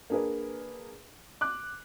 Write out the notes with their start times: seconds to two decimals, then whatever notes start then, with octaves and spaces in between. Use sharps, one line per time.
0.10 A#3 D4 G#4 A#4 B4
1.41 D6 F#6